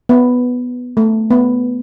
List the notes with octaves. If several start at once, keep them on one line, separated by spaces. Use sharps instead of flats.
B3
A3
B3